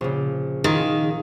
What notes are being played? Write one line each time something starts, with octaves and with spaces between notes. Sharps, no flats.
A#1 C#3
D#3 F4 G#4